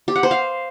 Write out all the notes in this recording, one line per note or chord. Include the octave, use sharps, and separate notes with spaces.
G4
F#5
C5
F5